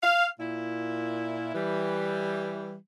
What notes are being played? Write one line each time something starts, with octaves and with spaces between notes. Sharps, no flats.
F5
A#2 E4
E3 G3